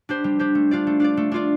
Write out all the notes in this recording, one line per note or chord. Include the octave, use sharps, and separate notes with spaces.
D4 G4 C5
G3
D4 G4 C5
A3
D4 F4 D5
A3
D4 F4 D5
A3
D4 F4 D5